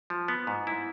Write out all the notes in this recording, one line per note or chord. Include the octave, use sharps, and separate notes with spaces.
F3
B3
G#2
E4